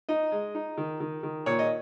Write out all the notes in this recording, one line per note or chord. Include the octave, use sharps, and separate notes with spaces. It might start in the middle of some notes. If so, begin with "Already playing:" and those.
D#4 D#5
G#3
D#4
D#3
D#3
D#3
A#2 C#5
D#5